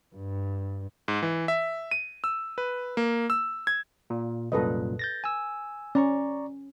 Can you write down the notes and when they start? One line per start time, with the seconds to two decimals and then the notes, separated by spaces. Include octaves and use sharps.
0.15 G2
1.08 G#2
1.22 E3
1.48 E5
1.91 D#7
2.24 E6
2.58 B4
2.97 A#3
3.30 E6
3.67 G#6
4.10 A#2
4.52 C2 F#2 A#2 A4 B4 D#5
4.99 G6 A6 A#6
5.24 G#5 E6
5.95 C#4 D5 A#5 C#6